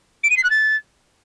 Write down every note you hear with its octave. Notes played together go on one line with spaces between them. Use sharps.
D7
D#7
C7
F#6
A6